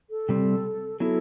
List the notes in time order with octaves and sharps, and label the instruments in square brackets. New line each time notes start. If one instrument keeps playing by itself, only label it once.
[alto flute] A4
[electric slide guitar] C3 G3 C4
[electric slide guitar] F#3 B3 E4 [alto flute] A4